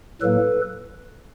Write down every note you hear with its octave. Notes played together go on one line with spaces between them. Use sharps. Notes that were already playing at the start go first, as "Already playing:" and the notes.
A2 F#3 A#3 A4 B4